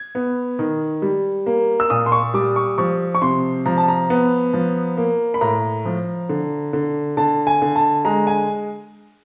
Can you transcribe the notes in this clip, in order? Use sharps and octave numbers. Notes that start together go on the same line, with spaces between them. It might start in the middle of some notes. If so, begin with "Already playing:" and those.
Already playing: G#6
B3
D#3
G3
A#3
E6
A#2 D#6
C6
C#6
G3 D6
C#6
F3 C#6
C#6
C3 C6
F3 A#5
A5
A#5
B3
F3
A#3
B5
A2 A#5
F3
D3
D3
D3 A5
G#5
D3
A5
G#3 A#5
G#5